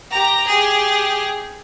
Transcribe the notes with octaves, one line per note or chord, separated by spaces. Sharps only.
G4 A#5
G4 G#4